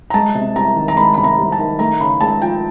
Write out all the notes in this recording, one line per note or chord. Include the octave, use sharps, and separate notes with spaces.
A#5
G#3 A5
C3
C2 A#5
D#3
A#5
G#3 B5
C3 B5
A#5
C2
A5
D#3
A3 A#5
C#3 B5
C#2 A5
F3 G5